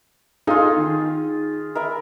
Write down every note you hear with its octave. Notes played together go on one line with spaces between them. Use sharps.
D#4 F4 G#4 A4 F5
D#3
A#4 E5 B5